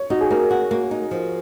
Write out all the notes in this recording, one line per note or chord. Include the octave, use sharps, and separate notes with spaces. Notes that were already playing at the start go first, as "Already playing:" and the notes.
Already playing: C#5
D#4 F#4
G#4
A#3 A#4
F#4
A#3
D#4
F3